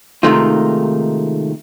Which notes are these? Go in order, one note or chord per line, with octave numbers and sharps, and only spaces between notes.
C3 D#3 G#3 A3 D#4 F4